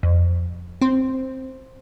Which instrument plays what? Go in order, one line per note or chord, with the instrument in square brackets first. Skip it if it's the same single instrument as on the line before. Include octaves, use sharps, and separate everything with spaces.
[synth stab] F2
C4 C5